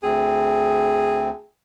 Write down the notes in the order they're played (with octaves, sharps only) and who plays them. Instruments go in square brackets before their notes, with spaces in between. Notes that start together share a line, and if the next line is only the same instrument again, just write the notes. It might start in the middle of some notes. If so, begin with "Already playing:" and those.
[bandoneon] D2 C4 [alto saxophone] G#4